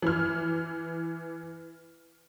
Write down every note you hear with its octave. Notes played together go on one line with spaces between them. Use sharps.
E3 F6